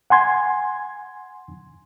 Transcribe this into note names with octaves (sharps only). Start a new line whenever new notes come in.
F#5 G#5 C6 G#6